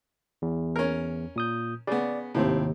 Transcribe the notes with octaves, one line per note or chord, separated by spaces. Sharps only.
E2
C#4 A#4
A#2 D#6 G6
C#3 B3 D5
G#1 D#2 A2 C3 C4